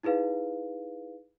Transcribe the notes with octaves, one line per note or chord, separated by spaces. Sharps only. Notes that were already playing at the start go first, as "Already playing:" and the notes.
D#4 E4 G#4 B4 F5